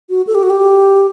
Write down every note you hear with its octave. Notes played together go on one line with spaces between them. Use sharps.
F#4
A4
G4
F#4
G4